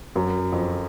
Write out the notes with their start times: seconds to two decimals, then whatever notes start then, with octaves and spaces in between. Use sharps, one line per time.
0.15 F#2 F#3
0.52 F2 F3